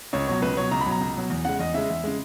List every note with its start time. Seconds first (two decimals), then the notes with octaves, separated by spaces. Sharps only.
0.13 C#2 C#5
0.27 B2 F#3 C#5
0.42 C#2 B4
0.57 B2 F#3 C#5
0.71 C#2 A#5
0.81 B5
0.86 B2 F#3
0.91 A#5
1.01 C#2
1.15 B2 F#3
1.30 E2
1.45 C#3 G#3 F#5
1.59 E2 D#5
1.74 C#3 G#3 E5
1.89 E2
2.04 C#3 G#3